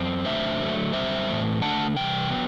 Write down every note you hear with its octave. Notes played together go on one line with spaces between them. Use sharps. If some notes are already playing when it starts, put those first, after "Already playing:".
Already playing: F#2 C4
C3 F#3 A3 D4 C5 E5
D3 F#3 A3
F#2 D3 G3 C4 C5 E5
A2 E3 A3 C4
D3 A3 D4 F#5 A5
C3 E3 G3 G5
F#3 B3